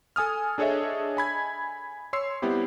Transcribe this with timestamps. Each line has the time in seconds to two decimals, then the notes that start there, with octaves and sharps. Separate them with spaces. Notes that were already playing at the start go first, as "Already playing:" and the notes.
0.16 A4 G#5 D#6 F6
0.58 D4 G#4 A4 C#5 D#5 E5
1.17 G#5 B5 G#6
2.13 C#5 C6 E6 C7
2.42 G3 B3 C4 E4 G4